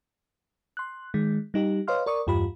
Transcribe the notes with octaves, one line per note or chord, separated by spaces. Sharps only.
C6 F#6
D#3 G#3
G3 D#4 G4
B4 C#5 D#5 F5 C6 F6
A#4 D5 C#6 D#6
E2 G2 F4 G4 B5